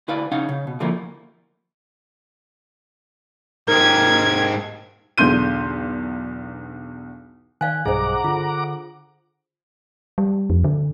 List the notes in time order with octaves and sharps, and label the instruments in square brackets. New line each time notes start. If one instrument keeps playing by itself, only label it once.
[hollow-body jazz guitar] D2 E4 B4 D5 F5
C#3 C#4 D#4 F5 F#5
C#3
B2
D3 E3 F3 A3 A#3 E4
[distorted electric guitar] G#2 G4 [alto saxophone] A#4 [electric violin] G#6
[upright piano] B1 E2 D3 C6 G6 D#7
[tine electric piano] D#3 F#6 [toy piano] D5 F5 G#5
[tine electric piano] B1 G2 D#5 [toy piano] G#4 C5 [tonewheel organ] F#5 A#5 D6
[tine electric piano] D3 [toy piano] F4
[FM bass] G3
F2
D3